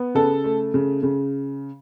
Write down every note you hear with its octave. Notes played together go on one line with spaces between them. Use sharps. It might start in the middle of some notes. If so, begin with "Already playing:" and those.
Already playing: B3
C#3 A4
A3
C#3
C#3